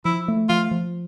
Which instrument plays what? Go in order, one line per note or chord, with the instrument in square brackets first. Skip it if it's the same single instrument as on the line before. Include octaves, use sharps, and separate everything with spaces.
[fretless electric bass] F3 [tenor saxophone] E4
[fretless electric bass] A3
[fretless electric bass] F3 [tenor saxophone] F4
[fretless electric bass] F3